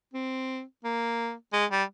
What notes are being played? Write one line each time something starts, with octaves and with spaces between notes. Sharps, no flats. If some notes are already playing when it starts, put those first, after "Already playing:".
C4
A#3
G#3
G3